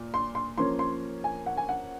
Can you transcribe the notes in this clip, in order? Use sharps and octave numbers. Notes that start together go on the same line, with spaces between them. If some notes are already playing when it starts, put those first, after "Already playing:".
Already playing: A#2
C6
C6
F3 A#3 C#4 C6
C6
G#5
F#5
G#5
F#5